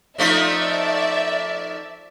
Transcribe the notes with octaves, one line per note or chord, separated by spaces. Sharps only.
F3 A3 D#4 D5 E5